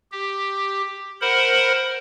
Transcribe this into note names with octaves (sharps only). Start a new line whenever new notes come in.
G4
A#4 C5 F#5 B5